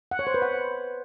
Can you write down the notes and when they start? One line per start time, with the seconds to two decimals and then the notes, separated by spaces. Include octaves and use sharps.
0.11 F#5
0.19 C#5
0.27 C5
0.34 B4
0.42 F#5